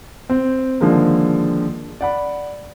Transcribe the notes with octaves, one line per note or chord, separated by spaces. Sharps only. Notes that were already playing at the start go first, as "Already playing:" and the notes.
C4
D3 D#3 F3 G#3 A#3
D5 F#5 B5